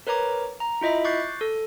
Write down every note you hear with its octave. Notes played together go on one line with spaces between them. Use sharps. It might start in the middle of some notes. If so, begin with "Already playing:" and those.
A#4 B4 C#5 A#5 D6
A#5
E4 F4 D#5 E5 B5
C#6 D6 F#6 G6 A6 C7
A4